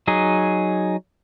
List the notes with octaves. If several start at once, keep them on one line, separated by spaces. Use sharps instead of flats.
F#3 D#4 G#4